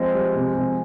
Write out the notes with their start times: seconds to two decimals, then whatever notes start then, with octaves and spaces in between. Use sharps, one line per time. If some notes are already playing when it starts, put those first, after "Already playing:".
Already playing: F3 G#3 C4
0.15 G3
0.35 C3
0.55 C3